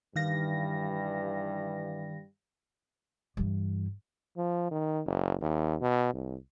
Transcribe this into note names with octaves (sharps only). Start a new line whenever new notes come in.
G2 D#3 E3 G3 F5 A#6
G2 E3
F3
D#3
F#1
D#2
B2
C2